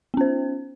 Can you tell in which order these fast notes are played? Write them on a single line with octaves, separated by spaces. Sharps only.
B3 C#4 C5